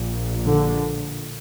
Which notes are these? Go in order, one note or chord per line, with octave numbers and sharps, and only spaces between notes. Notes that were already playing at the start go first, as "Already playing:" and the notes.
Already playing: A#1 A#2
D3